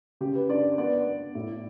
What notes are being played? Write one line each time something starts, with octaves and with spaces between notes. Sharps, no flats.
C#3 G4
B4
D4 D5
B3 D5
B3
A2